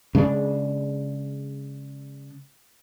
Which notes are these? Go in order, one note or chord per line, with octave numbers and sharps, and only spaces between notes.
C#3 G#3 A3 D4